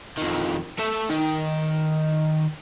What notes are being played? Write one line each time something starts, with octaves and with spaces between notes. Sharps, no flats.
F2 D#3
A3 E5
D#3